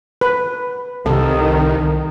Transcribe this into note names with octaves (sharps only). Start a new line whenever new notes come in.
B4
C2 C3 D#3 A4